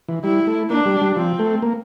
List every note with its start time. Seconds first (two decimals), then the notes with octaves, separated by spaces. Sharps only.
0.09 E3
0.24 G3 E4
0.47 A3
0.70 A#3 D4
0.86 G3
1.02 G3
1.16 F3 C4
1.39 A3
1.62 A#3